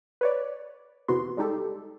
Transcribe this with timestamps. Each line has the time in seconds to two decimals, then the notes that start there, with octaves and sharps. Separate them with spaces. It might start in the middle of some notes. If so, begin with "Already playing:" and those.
0.21 B4 C#5 D5
1.08 E2 C3 E3 B3 F#4 C6
1.37 G3 G#3 D#4 G4 A4